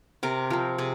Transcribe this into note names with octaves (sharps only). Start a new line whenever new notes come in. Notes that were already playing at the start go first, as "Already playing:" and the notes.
C3 A#4
F3 C4 A#4
C3 G#4